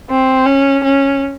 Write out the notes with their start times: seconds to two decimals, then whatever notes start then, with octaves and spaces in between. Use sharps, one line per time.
0.10 C4
0.46 C#4
0.84 C#4